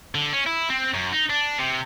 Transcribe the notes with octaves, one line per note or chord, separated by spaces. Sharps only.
D3
C#4
E4
C4
F#2
D#4
D4
C3